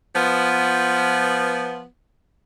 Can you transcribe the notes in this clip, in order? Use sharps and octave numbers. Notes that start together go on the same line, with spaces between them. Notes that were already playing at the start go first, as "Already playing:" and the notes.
F3 B3